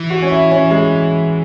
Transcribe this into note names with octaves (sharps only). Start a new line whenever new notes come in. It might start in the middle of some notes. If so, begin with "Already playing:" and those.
Already playing: E3
F#4
C#4
E4
C#4
G#3